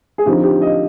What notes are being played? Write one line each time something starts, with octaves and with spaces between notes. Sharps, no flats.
G#4
D3 F3 C4 D#4 G4
G4
D#5